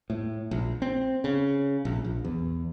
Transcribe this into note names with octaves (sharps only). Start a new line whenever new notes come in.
A2
A#1
C4
C#3
A#1
A#1
E2